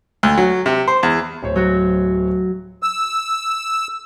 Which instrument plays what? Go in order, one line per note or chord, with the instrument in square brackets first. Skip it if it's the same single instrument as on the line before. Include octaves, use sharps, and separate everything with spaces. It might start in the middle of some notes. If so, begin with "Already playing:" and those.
[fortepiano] D2
F#3
C3
C5
E2
[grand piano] D1 C5 C#5
[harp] F#3 F#4
[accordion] E6